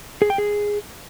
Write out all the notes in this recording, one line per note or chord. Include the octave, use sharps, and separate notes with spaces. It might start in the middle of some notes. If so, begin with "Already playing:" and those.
G#4
G5
G#4